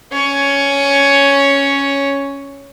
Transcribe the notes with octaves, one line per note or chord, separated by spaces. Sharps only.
C#4 C#5